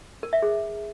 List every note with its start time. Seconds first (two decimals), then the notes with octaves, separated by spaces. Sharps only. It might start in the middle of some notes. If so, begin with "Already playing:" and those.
0.23 A#4
0.33 E5
0.42 G#4